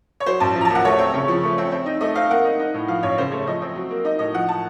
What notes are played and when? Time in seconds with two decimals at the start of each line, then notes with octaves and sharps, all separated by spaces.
0.20 C#5
0.26 F#3 C5
0.40 A1 A5
0.56 F3
0.61 A#5
0.65 A5
0.70 D#2 F#5
0.85 A3 C#5
0.99 C4
1.14 C#3
1.28 F3
1.43 A3
1.58 C4
1.72 C4
1.86 D#4
2.01 A3 D#5
2.16 C4 F5
2.30 A#3 F#5
2.45 D#4
2.59 D#4
2.74 A2
2.88 F3 F5
3.03 A1 C#5
3.18 C#3 C5
3.32 A3 C#5
3.47 F3 D#5
3.62 C4
3.76 F#3
3.90 A#3
4.04 D#4 D#5
4.19 A2 D#5
4.34 F3 F#5
4.49 A5